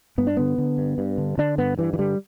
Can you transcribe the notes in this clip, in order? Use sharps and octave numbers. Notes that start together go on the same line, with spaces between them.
G2 B3
D4
D3 B3
D3
G2
G2
D3
D3 D4
G2 B3
G2 E3
E3
D3 G3